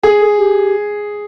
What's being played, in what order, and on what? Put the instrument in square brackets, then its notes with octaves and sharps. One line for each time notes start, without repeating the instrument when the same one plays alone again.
[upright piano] G#4 [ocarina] A4
[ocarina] A4
G4